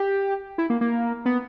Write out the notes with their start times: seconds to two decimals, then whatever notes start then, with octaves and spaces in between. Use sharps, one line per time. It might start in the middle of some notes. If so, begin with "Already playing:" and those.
Already playing: G4
0.58 E4
0.70 A#3
0.81 A#3
1.26 B3